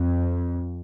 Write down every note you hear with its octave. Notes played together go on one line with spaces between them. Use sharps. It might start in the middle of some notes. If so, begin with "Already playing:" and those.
Already playing: F2